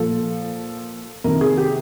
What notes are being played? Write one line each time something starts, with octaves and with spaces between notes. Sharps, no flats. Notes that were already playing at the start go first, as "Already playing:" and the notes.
Already playing: A#2 F3 A4
C3 D#3 A#4
G#4
G4